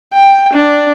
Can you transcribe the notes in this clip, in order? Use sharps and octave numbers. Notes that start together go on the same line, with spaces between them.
G5
D4